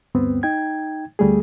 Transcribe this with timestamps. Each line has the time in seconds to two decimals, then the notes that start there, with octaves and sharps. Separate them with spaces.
0.15 D2 G2 B3 C4
0.43 D#4 G5 G#6
1.19 D2 G3 A3 G#4